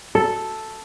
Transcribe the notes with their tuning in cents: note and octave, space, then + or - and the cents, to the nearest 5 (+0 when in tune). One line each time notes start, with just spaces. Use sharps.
A4 +0